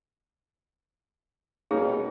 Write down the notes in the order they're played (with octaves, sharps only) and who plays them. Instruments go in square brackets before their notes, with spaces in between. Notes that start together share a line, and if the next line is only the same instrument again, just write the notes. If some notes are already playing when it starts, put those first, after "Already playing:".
[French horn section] B2 G3 [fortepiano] A#3 C#4 D#4 [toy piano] G#4